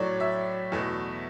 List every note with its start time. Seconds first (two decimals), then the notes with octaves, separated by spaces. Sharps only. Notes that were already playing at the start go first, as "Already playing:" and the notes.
Already playing: A2 F#3 A3 C#5 D5
0.20 E5
0.72 E2 B2 A3